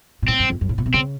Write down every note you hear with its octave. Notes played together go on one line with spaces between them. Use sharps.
A#2
A2 C4
F#2
F2
F#2
A2
A#2
C3
C#3 C4